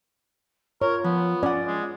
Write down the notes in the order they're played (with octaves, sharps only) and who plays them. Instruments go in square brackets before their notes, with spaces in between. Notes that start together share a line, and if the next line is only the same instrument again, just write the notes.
[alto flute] F4 [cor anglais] A#4 [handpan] C#5
[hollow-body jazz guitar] F3 [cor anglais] B3
[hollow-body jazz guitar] C#4 F#5 [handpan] D5
[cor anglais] G#3